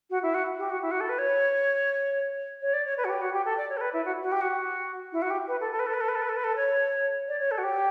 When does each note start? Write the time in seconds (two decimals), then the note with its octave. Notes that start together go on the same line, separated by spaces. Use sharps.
0.10 F#4
0.23 E4
0.34 F#4
0.58 G4
0.70 F#4
0.82 E4
0.91 F#4
1.00 A4
1.09 B4
1.19 C#5
2.62 C#5
2.73 D5
2.85 C#5
2.97 B4
3.05 F#4
3.10 G4
3.21 F#4
3.33 G4
3.45 A4
3.57 D5
3.69 C#5
3.77 A4
3.81 B4
3.93 E4
4.05 F#4
4.23 F#4
4.32 G4
4.41 F#4
5.12 E4
5.22 F#4
5.30 G4
5.48 B4
5.61 A4
5.72 A4
5.79 B4
5.87 A4
5.94 B4
6.01 A4
6.08 B4
6.15 A4
6.22 B4
6.29 A4
6.36 B4
6.44 A4
6.56 C#5
7.28 D5
7.40 C#5
7.51 A4
7.58 F#4
7.63 G4